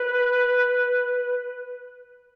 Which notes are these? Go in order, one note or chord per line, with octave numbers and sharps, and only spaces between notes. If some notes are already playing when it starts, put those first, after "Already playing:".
Already playing: B4